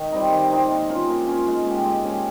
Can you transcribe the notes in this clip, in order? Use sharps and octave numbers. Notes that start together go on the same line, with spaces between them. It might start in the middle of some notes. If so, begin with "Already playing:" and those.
Already playing: D#3
G3 C4 D#4
D#3
G3 C4 D#4
A#3
C#4 F4
A#3
C#4 F4
G#3
C#4 G4
G#3
C#4 G4